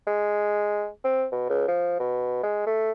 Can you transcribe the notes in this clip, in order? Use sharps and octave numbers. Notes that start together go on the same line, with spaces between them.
G#3
C4
B2
C#2
F3
B2
G#3
A3